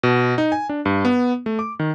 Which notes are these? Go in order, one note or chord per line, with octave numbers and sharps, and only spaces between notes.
B2
D#4
G#5
D4
G2
B3
A3
D6
D#3